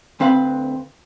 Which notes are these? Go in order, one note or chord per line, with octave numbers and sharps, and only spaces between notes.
D2 C4 B4 F5 A5 B5